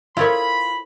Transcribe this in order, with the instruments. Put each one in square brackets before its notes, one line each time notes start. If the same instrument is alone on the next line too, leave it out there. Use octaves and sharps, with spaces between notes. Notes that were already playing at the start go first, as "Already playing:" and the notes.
[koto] E4 A#4 C#5 [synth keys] F4 [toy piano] A4 C5 C6 [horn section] B5